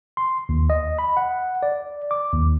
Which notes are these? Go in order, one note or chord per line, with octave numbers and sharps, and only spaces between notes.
C6
D#2
D#5
B5
F#5
D5
D6
D#2